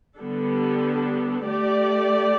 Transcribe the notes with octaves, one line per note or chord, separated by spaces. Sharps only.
D3 G3 B3 D4 A4
A3 G4 D5